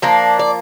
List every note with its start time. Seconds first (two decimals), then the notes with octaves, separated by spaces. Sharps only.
0.02 F3 A#3 D4
0.39 D5